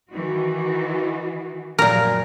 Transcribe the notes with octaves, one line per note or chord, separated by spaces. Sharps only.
D#3 E3 F#4
F#2 A#2 F3 A#4